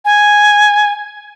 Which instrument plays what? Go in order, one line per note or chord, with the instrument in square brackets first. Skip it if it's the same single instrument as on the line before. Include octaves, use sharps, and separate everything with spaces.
[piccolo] G#5